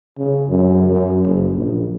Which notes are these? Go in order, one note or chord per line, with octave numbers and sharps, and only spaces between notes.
C#3
F#2
F#2
F#1
A#1